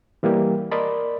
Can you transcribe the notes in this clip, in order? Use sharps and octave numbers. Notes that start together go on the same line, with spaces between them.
E3 G3 A#3 G4
A#4 D5 D#5 A5 B5 C6